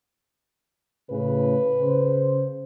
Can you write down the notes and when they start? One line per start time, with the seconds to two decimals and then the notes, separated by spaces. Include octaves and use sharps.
1.11 A2 C#3 B4
1.81 C#3 C5